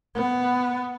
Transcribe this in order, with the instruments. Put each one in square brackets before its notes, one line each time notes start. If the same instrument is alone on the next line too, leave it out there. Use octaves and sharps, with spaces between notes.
[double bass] B3